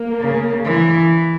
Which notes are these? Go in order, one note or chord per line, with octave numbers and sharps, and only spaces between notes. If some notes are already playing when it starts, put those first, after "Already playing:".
Already playing: A#3
C#3
E3